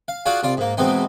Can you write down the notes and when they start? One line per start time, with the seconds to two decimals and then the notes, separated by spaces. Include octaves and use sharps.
0.08 F5
0.26 F4 F#4 G#4 D5 F5 F#5
0.43 C2 F4 D5
0.57 G#2 A#3
0.77 E2 B2 G#3 B3 C4 D#4